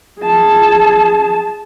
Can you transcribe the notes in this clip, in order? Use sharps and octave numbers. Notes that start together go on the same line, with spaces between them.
G#4 A5